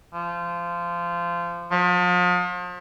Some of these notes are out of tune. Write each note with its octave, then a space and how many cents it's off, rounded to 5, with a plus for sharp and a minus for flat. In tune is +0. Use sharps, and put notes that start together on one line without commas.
F3 -20
F3 +40